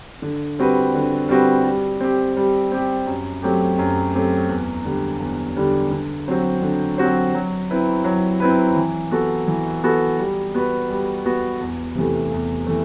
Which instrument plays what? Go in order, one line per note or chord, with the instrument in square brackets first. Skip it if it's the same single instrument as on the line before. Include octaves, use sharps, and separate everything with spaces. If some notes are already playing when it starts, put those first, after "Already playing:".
[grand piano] D3
G3 C4 F#4 B4
D3
G3 C4 F#4 B4
G3
C4 G4
G3
C4 G4
F#2
F#3 A3 C4 G4
F#2
F#3 A3 C4 G4
E2
D3 G3
E2
D3 G3
D3
F#3 C4 F#4 C5
D3
F#3 C4 F#4 C5
F#3
C4 E4 B4
F#3
C4 E4 B4
E3
B3 F#4 A4
E3
B3 F#4 A4
G3
B3 F#4 B4
G3
B3 F#4 B4
E2
C3 E3 A3
E2
E3 A3